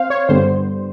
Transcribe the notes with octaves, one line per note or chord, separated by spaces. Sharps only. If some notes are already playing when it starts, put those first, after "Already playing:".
Already playing: C4 C5 F5
C#5
G2 D3 G3 B3 C5